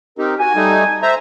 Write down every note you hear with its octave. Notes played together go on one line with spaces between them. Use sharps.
C4 D#4 G4 A#4
F#4 G#5
G3 A3 D#4
C5 E5 A#5